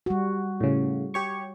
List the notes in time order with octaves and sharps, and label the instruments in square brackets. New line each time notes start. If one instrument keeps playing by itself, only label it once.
[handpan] G3 F#4
[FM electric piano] A2 C#3
G4 C#5 C#6